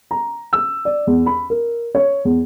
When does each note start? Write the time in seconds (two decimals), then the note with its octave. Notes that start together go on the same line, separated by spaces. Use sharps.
0.11 A#5
0.53 E6
0.85 D5
1.07 E2
1.26 B5
1.50 A#4
1.95 C#5
2.25 E2